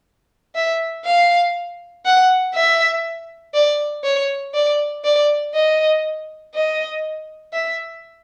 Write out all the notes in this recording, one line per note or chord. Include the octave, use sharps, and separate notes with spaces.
E5
F5
F#5
E5
D5
C#5
D5
D5
D#5
D#5
E5